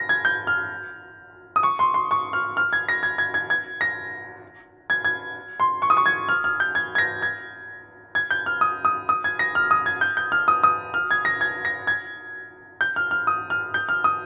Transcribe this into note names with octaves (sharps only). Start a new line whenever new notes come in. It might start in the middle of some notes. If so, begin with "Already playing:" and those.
Already playing: A#6
G#6
G6
F6
D#6
C#6
C6
C6
C#6
F6
F6
G#6
A#6
G#6
G#6
G#6
G#6
A#6
G#6
G#6
C6
C#6
D#6
C#6
G#6
F6
F6
G6
G#6
G#6
A#6
G#6
G#6
G6
F6
D#6
D#6
D#6
G#6
A#6
F6
D#6
G#6
G6
G6
F6
D#6
D#6
F6
G#6
A#6
G#6
A#6
G#6
G6
F6
F6
D#6
F6
G6
F6
D#6